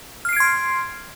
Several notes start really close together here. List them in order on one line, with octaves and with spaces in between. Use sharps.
F6 C7 D7 G#6 C6